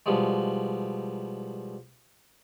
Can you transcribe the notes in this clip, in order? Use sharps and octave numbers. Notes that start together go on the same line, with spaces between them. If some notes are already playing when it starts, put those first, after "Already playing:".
B2 F3 G3 G#3